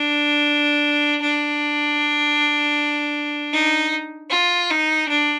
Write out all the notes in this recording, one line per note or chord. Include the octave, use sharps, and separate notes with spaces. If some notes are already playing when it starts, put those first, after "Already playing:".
Already playing: D4
D4
D#4
F4
D#4
D4